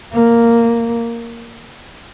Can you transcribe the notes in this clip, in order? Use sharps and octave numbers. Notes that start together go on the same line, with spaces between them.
A#3